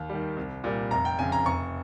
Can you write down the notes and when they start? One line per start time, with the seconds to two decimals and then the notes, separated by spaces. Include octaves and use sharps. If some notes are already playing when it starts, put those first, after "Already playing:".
Already playing: D#2
0.09 D#3 G3
0.37 C2
0.64 A#2 G3
0.91 F1 A#5
1.05 G5
1.19 F2 C#3 G#5
1.32 A#5
1.46 F1 C#6